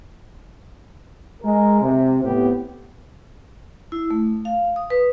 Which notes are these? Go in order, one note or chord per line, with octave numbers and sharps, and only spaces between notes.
G#3 A#4
C3
A2 B3 C4 G4
E4
A3
F5
D#6
B4